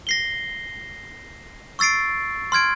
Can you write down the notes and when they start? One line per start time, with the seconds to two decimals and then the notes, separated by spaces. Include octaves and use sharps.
0.07 A#6 C7 G7
1.79 C#6 E6 A6 C7 D7
2.52 C6 F6 G#6 D7